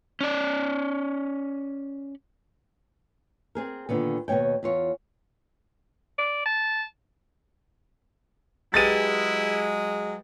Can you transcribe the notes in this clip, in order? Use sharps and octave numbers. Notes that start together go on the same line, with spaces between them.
C#4 D5
C4 G#4 A#4
A#2 D3 D#3 B3
D#2 B2 F3 C#5 G5
E2 F4 C#5
D5
A5
F#3 G#3 E4 G4 G#4 B4 A6 D#7